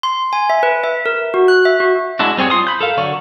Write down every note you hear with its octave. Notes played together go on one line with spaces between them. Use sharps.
C6
G#5
E5
B4
E5
A#4
F#4
F#6
E5
F#4
G#3 D4 E4 F#4
G3 C4 G#4 C#5
F4 C6 D#6
B5 G6
A4 A#4 F5
D3 F#3 D5 C#6